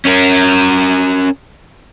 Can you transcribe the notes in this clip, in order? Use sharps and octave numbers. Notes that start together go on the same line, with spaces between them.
C#4 A#4